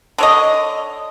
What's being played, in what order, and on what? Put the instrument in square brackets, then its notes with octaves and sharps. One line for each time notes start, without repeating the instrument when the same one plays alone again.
[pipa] D3 C#5 D#5